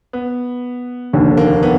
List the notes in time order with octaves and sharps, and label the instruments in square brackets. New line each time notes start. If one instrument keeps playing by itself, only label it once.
[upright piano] B3
[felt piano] F1 D#2 D3
[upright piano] A#3
B3